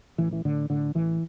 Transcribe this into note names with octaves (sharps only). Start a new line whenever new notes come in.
A1 E3
E3
A2 D3
A2 D3
A1 E3